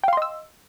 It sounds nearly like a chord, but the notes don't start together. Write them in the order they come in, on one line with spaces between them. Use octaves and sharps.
G5 F5 C6 D#5 E6